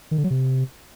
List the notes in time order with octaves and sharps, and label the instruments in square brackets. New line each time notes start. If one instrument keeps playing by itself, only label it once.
[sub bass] D#3
D3
F#3
C3